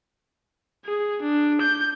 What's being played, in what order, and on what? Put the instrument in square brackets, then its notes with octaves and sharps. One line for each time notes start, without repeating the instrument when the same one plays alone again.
[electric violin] G#4
D4
G6